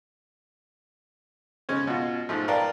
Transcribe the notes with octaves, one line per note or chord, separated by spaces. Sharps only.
C#3 G#3 C#4 C#5
B2 F4
G#2 F3 A3
A#4 B4 D5 F5 G5 A5